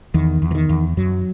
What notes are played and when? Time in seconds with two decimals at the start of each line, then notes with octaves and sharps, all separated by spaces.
0.14 E2 D#3
0.42 E2
0.51 E3
0.55 D#3
0.69 E2
0.97 F#2 F#3